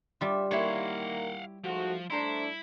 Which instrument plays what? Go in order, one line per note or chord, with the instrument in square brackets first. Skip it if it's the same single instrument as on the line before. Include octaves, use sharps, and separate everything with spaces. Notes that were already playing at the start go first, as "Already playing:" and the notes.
[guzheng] G3 F4 [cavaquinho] E5
[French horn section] D#3 A#3 [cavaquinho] E4 G4 C6 [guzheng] C#5 [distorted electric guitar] F5 F#5
[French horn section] G#2 A3 F#4 [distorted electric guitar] F3
[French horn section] A3 D4 [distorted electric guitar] E4 [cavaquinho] C5 A#5 C6